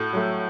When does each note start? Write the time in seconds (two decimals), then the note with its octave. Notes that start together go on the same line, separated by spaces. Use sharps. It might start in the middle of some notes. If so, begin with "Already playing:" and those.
Already playing: A2 F#4 A4
0.13 F#3 A3